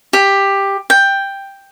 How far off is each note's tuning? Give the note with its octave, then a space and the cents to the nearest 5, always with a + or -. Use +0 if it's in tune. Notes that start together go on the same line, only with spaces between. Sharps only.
G4 +10
G5 +5